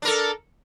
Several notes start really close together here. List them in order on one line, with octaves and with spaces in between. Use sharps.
D4 A#4 A4